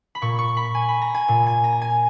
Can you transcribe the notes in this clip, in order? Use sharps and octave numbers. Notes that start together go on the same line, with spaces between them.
B5
A#2 C#6
C#6
B5
G#5
B5
A#5
G#5
A#2
G#5
A#5
G#5